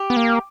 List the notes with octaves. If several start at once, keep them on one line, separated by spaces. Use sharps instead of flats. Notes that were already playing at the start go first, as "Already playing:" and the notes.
Already playing: G4
B3
A#3